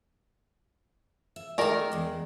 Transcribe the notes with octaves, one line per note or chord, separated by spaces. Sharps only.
E5
D#3 G#3 A3 A#4 D5
E2 G#3